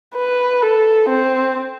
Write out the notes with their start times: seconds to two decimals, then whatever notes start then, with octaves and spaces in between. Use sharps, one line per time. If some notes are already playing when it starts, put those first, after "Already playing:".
0.15 B4
0.62 A4
1.09 C4